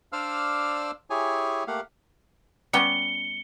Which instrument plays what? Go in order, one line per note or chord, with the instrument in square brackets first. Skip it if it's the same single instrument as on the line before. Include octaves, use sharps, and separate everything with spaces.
[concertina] D4 C5 D5 F5 E6 F6
E4 G4 G#4 C#5 G#5
A3 A#3 G4 F5 F#5
[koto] G3 B3 C#4 [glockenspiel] C#7 G7